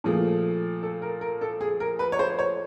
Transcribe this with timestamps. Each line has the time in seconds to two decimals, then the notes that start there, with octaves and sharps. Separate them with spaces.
0.04 A#2 F3 A3 G#4
0.83 A4
1.02 A#4
1.21 A#4
1.41 A4
1.61 G#4
1.80 A#4
1.99 B4
2.12 C#5
2.19 C5
2.39 C#5